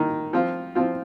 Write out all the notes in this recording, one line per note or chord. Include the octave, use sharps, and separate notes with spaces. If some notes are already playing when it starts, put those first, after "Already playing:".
Already playing: D#3 A#3 D#4
F3 C4 F4
F3 C4 F4